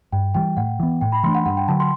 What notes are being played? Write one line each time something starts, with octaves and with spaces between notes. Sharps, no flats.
G2 G5
E3 G3 G5
A2 F#5
E3 B3
A2 G5
B5
E3 A3 D4 C6
F#5
G2 F#5
G5
D3 F#3 A5
C6